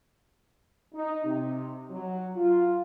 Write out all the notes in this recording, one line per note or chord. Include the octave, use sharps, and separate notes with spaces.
D#4
C3
F#3
F4